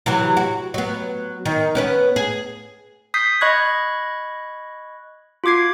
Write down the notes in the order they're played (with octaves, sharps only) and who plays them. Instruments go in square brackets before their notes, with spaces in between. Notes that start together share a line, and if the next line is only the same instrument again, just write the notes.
[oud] C3 E3 F#3
F#4
F#3 B3
D#3
B3 C#4 B4
G#4
[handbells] D#6 G6 B6 C7
D#5 B5 C#6 F#6 G#6
F4 F#4 D6 G#6 C7